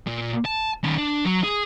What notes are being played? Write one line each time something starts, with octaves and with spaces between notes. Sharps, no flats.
A#2
A5
D#3 C#4
D4
F#3
G#4